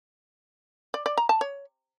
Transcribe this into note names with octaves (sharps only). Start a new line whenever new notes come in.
D5
D5
A#5
A5
C#5